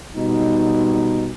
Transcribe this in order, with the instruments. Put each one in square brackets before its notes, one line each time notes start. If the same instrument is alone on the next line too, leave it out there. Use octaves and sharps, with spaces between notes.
[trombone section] B2 G3 D#4